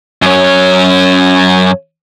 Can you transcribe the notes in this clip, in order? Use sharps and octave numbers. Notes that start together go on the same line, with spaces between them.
F#2 C#4